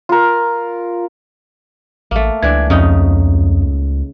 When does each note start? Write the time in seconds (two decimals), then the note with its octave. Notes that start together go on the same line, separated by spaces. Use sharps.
0.09 F4 A#4
2.11 A1 A3 A#3
2.43 C#2 E3 D4 G#6
2.70 F2 C#3 D#4